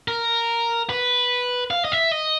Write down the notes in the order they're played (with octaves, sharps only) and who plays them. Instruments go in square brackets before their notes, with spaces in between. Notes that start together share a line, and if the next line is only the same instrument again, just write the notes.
[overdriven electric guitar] A#4
B4
F5
D#5
E5
D#5